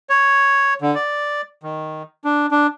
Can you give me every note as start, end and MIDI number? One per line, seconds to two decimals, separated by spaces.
0.09 0.74 73
0.82 0.95 50
0.95 1.41 74
1.63 2.03 51
2.24 2.46 62
2.51 2.67 62